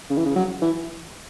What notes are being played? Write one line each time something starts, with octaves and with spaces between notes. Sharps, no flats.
C#3
E3
C#3
F#3
E3